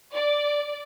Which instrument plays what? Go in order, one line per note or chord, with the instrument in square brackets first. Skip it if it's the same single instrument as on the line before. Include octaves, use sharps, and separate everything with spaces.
[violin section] D5